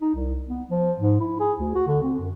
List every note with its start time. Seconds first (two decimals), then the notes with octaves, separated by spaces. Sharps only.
0.01 D#4
0.15 C2
0.48 B3
0.70 F3
0.98 G#2
1.20 E4
1.40 G#4
1.59 D2
1.75 F#4
1.88 D3
2.03 C4
2.19 F#2